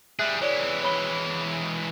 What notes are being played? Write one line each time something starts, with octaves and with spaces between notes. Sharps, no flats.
G3 G#4 E5 F#6
E3 G#3 C#5 D5
C#5 B5 G7